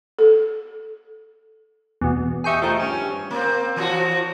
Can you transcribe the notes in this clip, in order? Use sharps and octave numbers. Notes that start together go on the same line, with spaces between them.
A4
E2 B2
G4 G#4 D#5 E5 G5 C#6
D#3 F3 A3
G2 C#4
A#3 C4
E3 F3 F#4